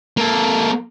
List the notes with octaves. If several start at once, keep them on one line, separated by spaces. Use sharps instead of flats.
A#3 A4